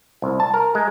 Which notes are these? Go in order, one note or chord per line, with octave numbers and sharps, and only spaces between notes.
C2
A5
A#4
G#3